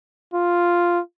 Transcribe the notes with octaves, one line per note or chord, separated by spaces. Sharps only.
F4